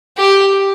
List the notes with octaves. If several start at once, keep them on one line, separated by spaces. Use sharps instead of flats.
G4